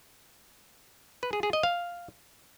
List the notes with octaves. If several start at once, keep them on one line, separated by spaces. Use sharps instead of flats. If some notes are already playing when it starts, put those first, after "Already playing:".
B4
G#4
G#4
D#5
F5